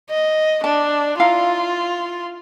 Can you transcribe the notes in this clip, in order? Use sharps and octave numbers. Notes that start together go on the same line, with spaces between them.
D#5
D4 A5
E4 F4 F5 A#5